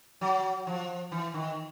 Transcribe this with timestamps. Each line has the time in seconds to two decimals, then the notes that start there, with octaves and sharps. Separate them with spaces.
0.21 F#3
0.67 F3
1.12 E3
1.34 D#3